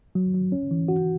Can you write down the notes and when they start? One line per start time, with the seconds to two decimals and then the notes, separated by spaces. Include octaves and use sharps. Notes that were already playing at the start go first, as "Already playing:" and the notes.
0.15 F#3
0.34 F#3
0.52 C#4
0.71 E3
0.88 F#4